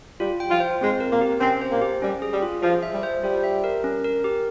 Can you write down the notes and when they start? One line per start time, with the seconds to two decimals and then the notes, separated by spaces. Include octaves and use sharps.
0.20 G3 F4
0.40 G5
0.50 F3 F4
0.60 C5
0.80 G#2 G#3 C4
1.00 A#4
1.11 A#2 A#3
1.21 G4
1.41 C3 C4 C#4
1.62 C5
1.71 A#2 A#3
1.82 G4
2.02 G3 C#4
2.22 G#4
2.33 G3
2.42 F4
2.62 F3 G#4
2.83 E5
2.93 G3
3.03 C5
3.23 G3 F4
3.44 E5
3.64 A#4
3.84 C#4
4.04 A#4
4.24 G4